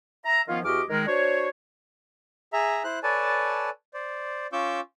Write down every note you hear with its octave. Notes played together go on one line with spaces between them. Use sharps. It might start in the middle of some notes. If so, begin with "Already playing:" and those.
E5 A#5
D#3 F3 B3 C#4 F4
E2 F#4 G4 D#5 D6 F6
D#3 G#3 A#4
D4 F#4 C5 C#5
G#4 E5 A#5
E4 C5 F#6
A4 B4 C#5 D5 G#5 A5
C5 D5
C#4 F4 C#6 D6 E6 G6